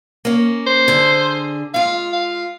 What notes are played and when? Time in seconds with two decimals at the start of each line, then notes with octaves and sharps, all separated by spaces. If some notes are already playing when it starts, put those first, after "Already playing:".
0.25 A#3 C#4
0.67 C5
0.88 D3 G#4
1.74 G#3 F4 F5
2.13 F5